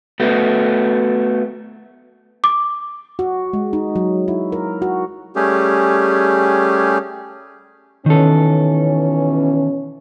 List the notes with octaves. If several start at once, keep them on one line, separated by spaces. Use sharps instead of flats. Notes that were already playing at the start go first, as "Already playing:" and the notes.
A3 B3 F#4
D6
F#4
G#3
D#4
F#3
E4
A#4
F#4
G3 A3 C#4 G4 G#4
B2 D#3 E3 C#4 A4